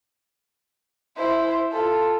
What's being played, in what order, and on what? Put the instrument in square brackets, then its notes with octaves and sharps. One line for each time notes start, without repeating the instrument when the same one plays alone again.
[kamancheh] E4 C5
F4 A4